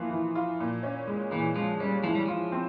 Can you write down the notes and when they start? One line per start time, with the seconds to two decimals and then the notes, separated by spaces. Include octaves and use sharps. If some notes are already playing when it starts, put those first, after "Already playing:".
Already playing: E3 F3 A#3 F4
0.11 E3
0.35 F4
0.60 A#2
0.83 C#4
1.07 G#3
1.31 A#2 E3
1.56 F3 G#3
1.80 G3 C#4
2.04 E3 F3
2.15 G3
2.26 F3 F4
2.52 C4